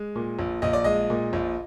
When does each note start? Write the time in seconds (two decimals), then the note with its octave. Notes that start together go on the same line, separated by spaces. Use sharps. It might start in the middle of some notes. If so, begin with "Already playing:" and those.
Already playing: G#3
0.15 A#2
0.39 A#1
0.62 A#1 D#5
0.73 D5
0.84 G#3 D#5
1.10 A#2
1.33 A#1